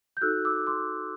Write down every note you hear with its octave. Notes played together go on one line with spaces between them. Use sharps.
G6
D#4 F#4 A4 E6 F#6
D6 E6
C6 D6